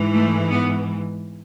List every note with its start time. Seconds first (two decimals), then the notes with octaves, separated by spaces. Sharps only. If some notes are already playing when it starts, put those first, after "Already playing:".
Already playing: G#2 E3
0.14 A3
0.50 B3